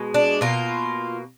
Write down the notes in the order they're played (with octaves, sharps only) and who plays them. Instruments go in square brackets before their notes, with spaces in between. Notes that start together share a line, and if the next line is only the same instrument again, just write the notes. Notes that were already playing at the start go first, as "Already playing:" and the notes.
Already playing: [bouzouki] B2 G#3
D4
B2 A#3 F4